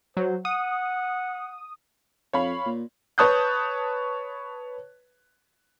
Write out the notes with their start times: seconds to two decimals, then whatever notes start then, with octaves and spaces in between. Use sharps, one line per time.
0.17 F#3 C5
0.45 F#5 D#6
2.33 F2 C#5 F5 B5
2.66 A#2
3.18 B4 C#5 A5 D#6 F#6 G6